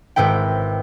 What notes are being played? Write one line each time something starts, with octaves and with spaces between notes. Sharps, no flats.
G#1 G#2 E4 B4 G5